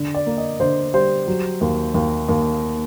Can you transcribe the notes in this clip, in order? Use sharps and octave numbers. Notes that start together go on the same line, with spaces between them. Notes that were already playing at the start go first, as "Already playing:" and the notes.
Already playing: D3
D5
A#3
D#5
D3 C5
G3 C5
F#3
D#2
D#2
D#2